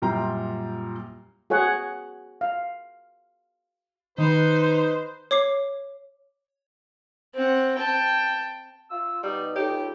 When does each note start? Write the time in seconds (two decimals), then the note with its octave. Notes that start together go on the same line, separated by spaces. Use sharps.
0.02 F#2 A#2 G3 G5 A#5 C6
1.50 F#4 G#4 C#5 F#5
2.41 F5
4.18 D#3 D#4 B4 C5
5.31 C#5 D6 C7
7.35 C4 F#5
7.75 G5 A5
8.90 F4 E6
9.23 B2 G3 D#4
9.56 D#4 G4 A4 C#5
9.68 C#2 D#4